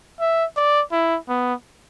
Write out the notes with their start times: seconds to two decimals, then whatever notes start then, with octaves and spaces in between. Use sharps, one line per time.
0.20 E5
0.57 D5
0.92 E4
1.29 B3